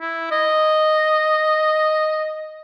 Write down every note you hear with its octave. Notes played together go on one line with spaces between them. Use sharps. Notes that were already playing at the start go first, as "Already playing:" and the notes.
E4
D#5